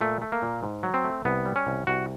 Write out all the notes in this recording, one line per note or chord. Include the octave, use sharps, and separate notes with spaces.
A#2 A3
A3
A#3
A#2
G#2
F#3
C4
A3
C2 B3
G3
C#4
C2
C2 F#4